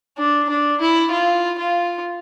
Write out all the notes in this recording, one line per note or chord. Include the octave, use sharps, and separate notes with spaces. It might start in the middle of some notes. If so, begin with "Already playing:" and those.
D4
D4
E4
F4
F4